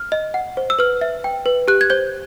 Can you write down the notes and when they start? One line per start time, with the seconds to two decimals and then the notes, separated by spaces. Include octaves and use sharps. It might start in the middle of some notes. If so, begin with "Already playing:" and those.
Already playing: F6
0.12 D#5
0.34 F#5
0.57 C5
0.70 E6
0.79 B4 F6
1.01 E5
1.24 G5
1.46 B4
1.68 G4 F#6
1.81 G#6
1.90 C5 G6